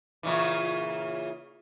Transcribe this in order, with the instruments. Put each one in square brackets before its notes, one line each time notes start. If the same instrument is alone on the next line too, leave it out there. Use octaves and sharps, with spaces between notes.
[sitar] A#2 C#3 E3